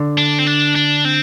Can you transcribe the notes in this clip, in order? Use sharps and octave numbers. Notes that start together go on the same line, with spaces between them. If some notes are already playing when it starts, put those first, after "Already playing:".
Already playing: D3
D4
C4
D4
D4
C4